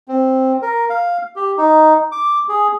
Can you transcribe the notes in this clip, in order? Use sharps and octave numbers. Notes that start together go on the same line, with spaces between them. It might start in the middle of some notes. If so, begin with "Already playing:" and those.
C4
A#4
F5
G4
D#4
D6
G#4